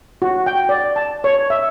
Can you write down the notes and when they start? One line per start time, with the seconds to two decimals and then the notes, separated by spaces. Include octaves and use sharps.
0.22 F#4
0.46 G5
0.69 D5
0.96 A5
1.24 C#5
1.50 E5